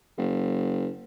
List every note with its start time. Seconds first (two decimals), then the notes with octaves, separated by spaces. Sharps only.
0.17 F#1